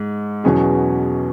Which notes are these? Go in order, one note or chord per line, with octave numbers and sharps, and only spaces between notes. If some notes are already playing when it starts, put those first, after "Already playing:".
Already playing: G#2
E2 B2 F#3 C#4 G#4